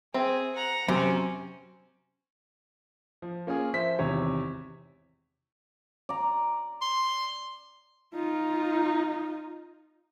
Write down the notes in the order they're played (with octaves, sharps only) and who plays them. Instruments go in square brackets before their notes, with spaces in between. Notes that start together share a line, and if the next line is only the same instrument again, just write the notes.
[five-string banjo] C4 E5 [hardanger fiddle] G#4
[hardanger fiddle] F#5 A#5
[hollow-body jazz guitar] F#2 C3 [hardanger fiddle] C4 C#4 [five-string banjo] C5
[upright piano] F3
A#3 C#4 F4 G#4
F3 C5 E5 B6
G#1 E2 C3 C#5
[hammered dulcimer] D5 A#5
[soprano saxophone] C6
[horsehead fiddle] D#4 F4